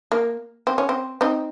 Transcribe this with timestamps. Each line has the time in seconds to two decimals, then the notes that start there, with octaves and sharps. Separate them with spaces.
0.12 A#3
0.67 C4
0.78 C#4
0.89 C4
1.21 C4 D#4